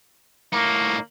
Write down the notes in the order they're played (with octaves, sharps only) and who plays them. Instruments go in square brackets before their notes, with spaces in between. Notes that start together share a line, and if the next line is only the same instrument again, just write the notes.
[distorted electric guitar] A2 D#4 [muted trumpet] A#3